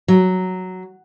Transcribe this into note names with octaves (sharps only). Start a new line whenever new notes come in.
F#3